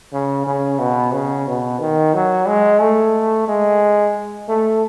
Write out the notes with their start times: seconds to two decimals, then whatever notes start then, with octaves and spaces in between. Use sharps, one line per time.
0.13 C#3
0.46 C#3
0.79 B2
1.14 C#3
1.47 B2
1.80 D#3
2.14 F#3
2.47 G#3
2.81 A3
3.48 G#3
4.49 A3